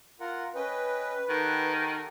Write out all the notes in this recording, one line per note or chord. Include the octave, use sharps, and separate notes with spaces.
F4 A#4 F#5
C#4 B4 D#5 G5
D#3 G4 A4 F#5